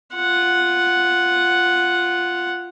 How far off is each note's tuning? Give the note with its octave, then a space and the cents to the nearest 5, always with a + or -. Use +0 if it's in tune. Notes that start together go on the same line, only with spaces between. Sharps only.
F4 -5 F#5 +0